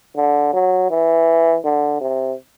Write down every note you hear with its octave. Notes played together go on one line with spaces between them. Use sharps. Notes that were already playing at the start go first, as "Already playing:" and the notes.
D3
F#3
E3
D3
C3